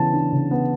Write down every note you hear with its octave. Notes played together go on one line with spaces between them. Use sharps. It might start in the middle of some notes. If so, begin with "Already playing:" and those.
Already playing: C#3 E3 B3 A5
D4
C#3
B3